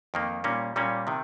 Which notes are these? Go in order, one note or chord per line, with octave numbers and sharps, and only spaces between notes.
F2 D#3 A#3
A#2 G3 A#3 C#4
A#2 G3 A#3 C#4
C3 D#3